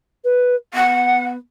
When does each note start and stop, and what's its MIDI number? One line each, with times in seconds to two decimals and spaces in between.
0.24 0.55 71
0.73 1.37 59
0.73 1.25 78